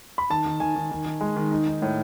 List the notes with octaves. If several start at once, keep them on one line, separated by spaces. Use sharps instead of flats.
B5
D#3 A5
D#3
D#3 G#5
D#3
D#3
D#3
G#3
D#3
D#4
D#4
A2